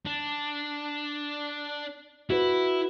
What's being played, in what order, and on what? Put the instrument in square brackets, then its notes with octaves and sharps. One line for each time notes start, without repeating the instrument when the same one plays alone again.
[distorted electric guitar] D4
[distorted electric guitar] E4 [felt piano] F#4 B4